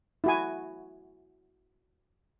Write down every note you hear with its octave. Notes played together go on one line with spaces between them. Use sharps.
E4 F#4 G#5